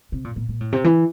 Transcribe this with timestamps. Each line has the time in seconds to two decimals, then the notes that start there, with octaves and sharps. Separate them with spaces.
0.12 C3
0.24 A#2
0.36 A#2
0.49 A#2
0.60 A2
0.73 C3
0.84 E3